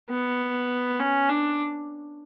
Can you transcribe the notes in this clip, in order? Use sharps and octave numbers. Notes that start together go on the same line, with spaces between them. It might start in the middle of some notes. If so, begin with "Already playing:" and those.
B3
C#4
D4